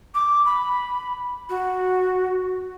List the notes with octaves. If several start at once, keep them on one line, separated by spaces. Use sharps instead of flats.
D6
B5
F#4